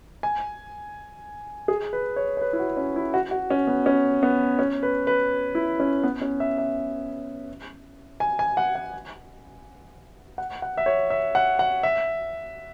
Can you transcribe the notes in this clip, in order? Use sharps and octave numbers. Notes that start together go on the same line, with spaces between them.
G#5
G#4
B4
C#5
C#5
B4
E4
F#4
C#4
E4
F#4
F#4
C#4
B3
C#4
B3
C#4
B4
B4
E4
C#4
B3
C#4
E5
E5
G#5
G#5
F#5
F#5
F#5
F#5
E5
C#5
E5
F#5
F#5
E5